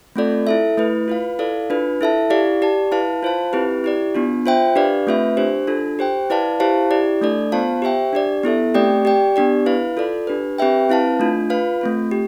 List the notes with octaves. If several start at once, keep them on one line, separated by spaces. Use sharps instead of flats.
A3 C4 F4 A4 D5
E4 A4 E5
A3 E4 B4
F4 B4 F5
E4 A4 D5 F5
D4 F4 B4
E4 A4 E5 A5
E4 G4 D5 F5
G4 D5 A5
E4 B4 F5 A5
F4 C5 F5 A5
C4 E4 G4 B4
E4 G4 D5
B3 D4 F4
F4 C5 E5 G5
D4 G4 B4 D5 F5
A3 C4 F4 B4 E5
D4 G4 C5
D4 F4 A4
G4 C5 G5
E4 B4 D5 F5 A5
E4 G4 C5 F5 A5
E4 G4 D5
A3 D4 A4 D5
B3 F4 C5 F5 A5
G4 C5 E5 G5
D4 G4 D5
B3 E4 A4 E5
A3 C4 G4 D5 G5
G4 D5 G5
B3 D4 G4 D5
E4 B4 F5
F4 A4 D5
D4 G4 B4
C4 G4 B4 E5 G5
C4 E4 B4 F5 A5
A3 D4 F4
F4 B4 F5
A3 C4 F4
G4